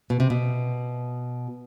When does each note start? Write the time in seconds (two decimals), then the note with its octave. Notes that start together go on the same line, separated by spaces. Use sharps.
0.10 B2
0.20 C3
0.30 B2